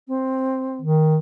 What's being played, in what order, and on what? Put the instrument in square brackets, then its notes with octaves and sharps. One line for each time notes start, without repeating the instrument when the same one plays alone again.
[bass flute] C4
[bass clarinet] D#3